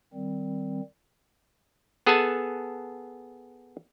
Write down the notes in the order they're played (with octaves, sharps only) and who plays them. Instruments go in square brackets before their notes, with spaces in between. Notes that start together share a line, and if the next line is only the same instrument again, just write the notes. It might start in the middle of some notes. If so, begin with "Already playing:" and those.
[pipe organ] D#3 G3 C4
[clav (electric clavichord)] B3 G#4 A4 F#5 G#5 A5